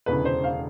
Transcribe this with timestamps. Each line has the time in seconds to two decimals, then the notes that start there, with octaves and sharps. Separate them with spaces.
0.06 E1 D2 C#3 E3 B4
0.25 C5
0.44 F5